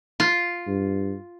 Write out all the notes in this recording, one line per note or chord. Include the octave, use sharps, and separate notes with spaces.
F4
G2